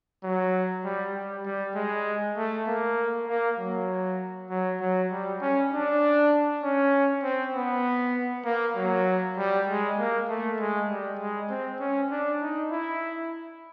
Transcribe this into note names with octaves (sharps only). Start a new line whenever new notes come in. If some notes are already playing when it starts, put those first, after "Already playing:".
F#3
G3
G3
G3
G#3
A3
A#3
A#3
F#3
F#3
F#3
G3
C#4
D4
C#4
C4
B3
A#3
F#3
G3
G#3
A#3
A3
G#3
G3
G#3
C4
C#4
D4
D#4
E4